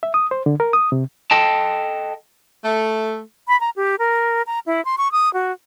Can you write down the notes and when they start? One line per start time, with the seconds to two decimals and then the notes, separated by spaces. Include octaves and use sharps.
0.03 E5
0.14 D#6
0.31 C5
0.46 D3
0.60 A#4
0.73 D#6
0.92 C3
1.31 A4 D#5 G5 A5
2.63 A3
3.48 B5
3.60 A#5
3.76 G4
3.99 A#4
4.47 A#5
4.66 E4
4.85 C6
4.98 C#6
5.12 D#6
5.34 F#4